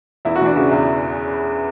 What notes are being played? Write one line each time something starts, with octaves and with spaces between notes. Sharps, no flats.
E2 E4
F#4
E3 D4
C#3 F#4
E2 E4